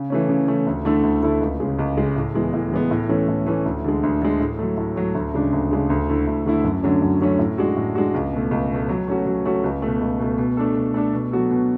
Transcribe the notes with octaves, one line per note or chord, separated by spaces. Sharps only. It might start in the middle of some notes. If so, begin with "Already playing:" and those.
Already playing: C#3
E3 A3 C#4
C#3
E3 A3 C#4
D2
D3 A3 E4 A4
D2
D3 A3 E4 A4
C#2
C#3 G#3
C#2
C#3 G#3
A2
E3 G#3 B3
A2
E3 G#3 B3
A2
E3 A3 C#4
A2
E3 A3 C#4
D2
D3 G#3
D2
D3 G#3
A2
F#3 A3
A2
F#3 A3
D2
C#3 G#3 D4
D2
C#3 G#3 D4
D2
D3 A3 E4
D2
D3 A3 E4
F#2
D3 F#3 A3 C#4
F#2
D3 F#3 A3 C#4
A2
G#3 D4 F#4
A2
G#3 D4 F#4
C#2
B2 A3
C#2
B2 A3
F#3
A3 C#4 F#4
F#3
A3 C#4 F#4
C#2
B2 A3
C#2
B2 A3
B2
A3 D4 A4
B2
A3 D4 A4
B2
F#3 B3 F#4 A4
B2